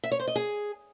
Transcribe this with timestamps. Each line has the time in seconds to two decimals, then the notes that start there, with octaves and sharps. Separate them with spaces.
0.04 E5
0.12 C#5
0.20 C5
0.28 D#5
0.36 G#4